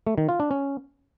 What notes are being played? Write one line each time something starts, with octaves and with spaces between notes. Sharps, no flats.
A3
D#3
F4
D4
C#4